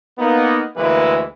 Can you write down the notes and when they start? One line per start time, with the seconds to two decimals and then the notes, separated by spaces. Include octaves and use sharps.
0.19 A#3 B3 D#4
0.76 D2 E3 G#3 A#3 E4 B4